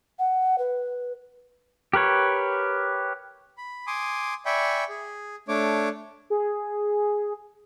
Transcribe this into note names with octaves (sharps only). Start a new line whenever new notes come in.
F#5
B4
G4 A#4 B4 C#5
B5
G#5 C6 D6 D#6
D5 E5 G5 G#5 B5 C#6
G#4
A3 D4 C#5 D6
G#4